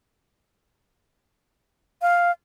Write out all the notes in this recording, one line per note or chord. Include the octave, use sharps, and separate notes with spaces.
F5